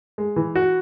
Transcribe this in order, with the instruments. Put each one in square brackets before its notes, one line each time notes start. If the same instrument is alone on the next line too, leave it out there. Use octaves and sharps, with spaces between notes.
[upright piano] G#3
E3
F#4